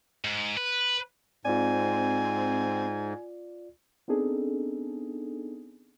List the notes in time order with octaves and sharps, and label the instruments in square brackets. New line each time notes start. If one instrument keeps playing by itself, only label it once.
[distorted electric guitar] G#2
B4
[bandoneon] G#2 [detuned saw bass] C4 [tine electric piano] F4 D5 [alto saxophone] G#5
[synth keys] B3 C4 D4 D#4 G#4 A4